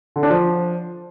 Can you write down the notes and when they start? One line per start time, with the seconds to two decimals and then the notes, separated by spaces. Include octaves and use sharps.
0.16 D3
0.23 D4
0.30 F3